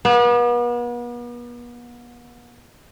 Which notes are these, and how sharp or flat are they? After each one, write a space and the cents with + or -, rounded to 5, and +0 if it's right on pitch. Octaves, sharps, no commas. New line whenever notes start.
B3 -40